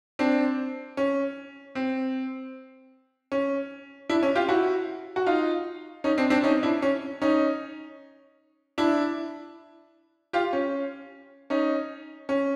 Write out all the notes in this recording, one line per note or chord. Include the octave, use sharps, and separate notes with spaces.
C4 D4
C#4
C4
C#4
D4 E4
C#4
F4 G4
E4 F#4
F#4
D#4 F4
C#4 D#4
C4 D4
C4 D4
C#4 D#4
D4 E4
C#4
C#4 D#4
D4 E4
F4 G4
C#4
C#4 D#4
C#4